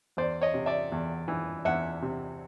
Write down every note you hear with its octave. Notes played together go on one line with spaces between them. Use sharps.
E2 C5 D5
C#5 D#5
C3
D5 E5
E2
E3
E2 E5 F#5
C3